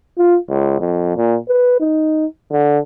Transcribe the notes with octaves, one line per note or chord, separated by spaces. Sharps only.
F4
C#2
F2
A#2
B4
D#4
D3